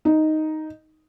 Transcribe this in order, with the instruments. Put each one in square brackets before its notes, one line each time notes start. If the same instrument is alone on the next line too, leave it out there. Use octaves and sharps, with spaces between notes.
[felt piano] D#4